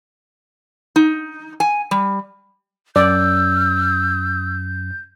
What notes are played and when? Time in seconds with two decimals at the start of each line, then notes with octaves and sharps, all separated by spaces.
0.96 D#4
1.60 G#5
1.91 G3
2.96 F#2 D5 E6 G6